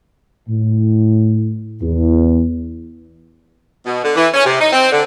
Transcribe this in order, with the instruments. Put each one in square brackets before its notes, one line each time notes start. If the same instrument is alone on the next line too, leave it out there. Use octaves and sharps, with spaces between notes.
[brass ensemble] A2
E2
[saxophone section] B2
D3
E3
C#4
C3
D#4
C4
D3